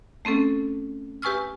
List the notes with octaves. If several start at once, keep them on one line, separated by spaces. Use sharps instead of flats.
A3 C4 C#4 A4
G4 B4 G#5 C#6 E6 F6